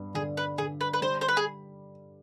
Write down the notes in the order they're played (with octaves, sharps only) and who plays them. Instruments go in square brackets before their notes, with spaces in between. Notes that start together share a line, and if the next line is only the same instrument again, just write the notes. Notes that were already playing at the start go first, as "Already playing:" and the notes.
Already playing: [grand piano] G2 B3
[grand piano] D3 [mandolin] G#4
[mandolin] B4
[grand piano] D3 [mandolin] G#4
[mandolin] B4
B4
[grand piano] G3 [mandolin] C5
[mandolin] C5
B4
G#4